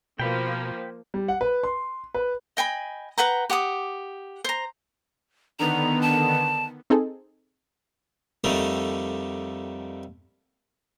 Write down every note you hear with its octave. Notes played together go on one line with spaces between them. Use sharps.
B2 F3 A#3 G5 B5
G3
F#5
B4
C6
B4
D#5 G5 G#5 B5
B4 F#5 G5 A#5
G4 F#5 D6 D#6
C5 A#5
D3 D#3 B3 A#5
A5
C4 D#4 G#4 A4
F2 D3 D#3 G3 A3